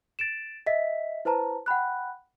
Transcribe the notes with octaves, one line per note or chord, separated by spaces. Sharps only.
A6 D7 E7
D#5 E5 B6
E4 B4 C5 A5 A#5
F#5 G5 B5 F#6